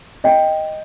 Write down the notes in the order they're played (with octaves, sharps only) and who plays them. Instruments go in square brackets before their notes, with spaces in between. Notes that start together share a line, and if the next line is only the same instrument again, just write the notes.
[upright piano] D#5 G5